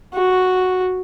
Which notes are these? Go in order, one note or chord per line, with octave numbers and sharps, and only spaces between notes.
F#4